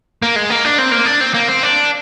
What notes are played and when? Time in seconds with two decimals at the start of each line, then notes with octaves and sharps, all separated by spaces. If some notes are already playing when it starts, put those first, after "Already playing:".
0.22 A#3
0.36 G#3
0.50 A#3
0.65 D4
0.78 C4
0.92 A#3
1.06 D4
1.21 C4
1.34 A#3
1.48 C4
1.63 D4